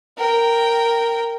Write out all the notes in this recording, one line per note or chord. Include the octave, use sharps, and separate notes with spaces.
A#4 G5